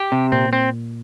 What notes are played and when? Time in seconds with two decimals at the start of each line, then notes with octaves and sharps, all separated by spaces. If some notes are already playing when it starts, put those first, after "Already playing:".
Already playing: G4
0.12 C3
0.32 A#2 C4
0.53 C4